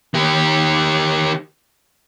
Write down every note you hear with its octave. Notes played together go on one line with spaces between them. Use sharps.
D#3 G4